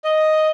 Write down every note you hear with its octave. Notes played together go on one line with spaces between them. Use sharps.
D#5